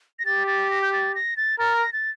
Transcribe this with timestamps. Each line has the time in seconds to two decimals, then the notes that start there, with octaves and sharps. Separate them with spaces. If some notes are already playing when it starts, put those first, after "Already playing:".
0.19 A#6
0.26 G4 A6
0.47 A6
0.71 A#6
0.82 G6
0.93 A6
1.15 A#6
1.37 A6
1.59 A#4 A6
1.76 A#6
1.93 A6